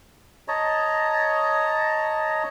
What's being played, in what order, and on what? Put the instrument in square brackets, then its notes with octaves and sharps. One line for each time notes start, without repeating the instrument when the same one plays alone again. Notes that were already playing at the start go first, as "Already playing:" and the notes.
[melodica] C#5 D#5 A5 A#5